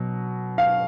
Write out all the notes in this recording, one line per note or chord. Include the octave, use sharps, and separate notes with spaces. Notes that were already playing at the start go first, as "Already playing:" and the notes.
Already playing: B2 F#3
F5